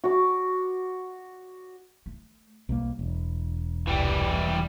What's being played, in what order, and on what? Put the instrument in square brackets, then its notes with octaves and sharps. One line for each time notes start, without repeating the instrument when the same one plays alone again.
[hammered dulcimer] F#4 D6
[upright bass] A3
[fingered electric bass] B1 A#3 [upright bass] F2 G3
[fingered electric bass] E1
[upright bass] C2 F#2 [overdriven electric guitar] E3 G3